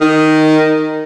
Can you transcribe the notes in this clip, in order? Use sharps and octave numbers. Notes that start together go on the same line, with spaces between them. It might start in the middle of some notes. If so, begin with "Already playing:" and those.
D#3